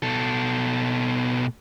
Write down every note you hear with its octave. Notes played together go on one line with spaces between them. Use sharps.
B2 A4